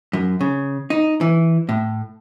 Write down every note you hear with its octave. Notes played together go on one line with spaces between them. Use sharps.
F#2
C#3
D#4
E3
A2